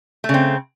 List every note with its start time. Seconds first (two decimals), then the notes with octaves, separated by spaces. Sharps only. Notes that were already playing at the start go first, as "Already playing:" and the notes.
0.24 A3
0.29 C#3
0.34 C4